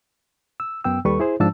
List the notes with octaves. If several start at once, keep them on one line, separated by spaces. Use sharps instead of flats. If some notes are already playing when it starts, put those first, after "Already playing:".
E6
F#2 B3 G5 E6
D#2 G3 A4 B4 C#6
E4 G#4 C5
G#2 F3 D4 A5 E6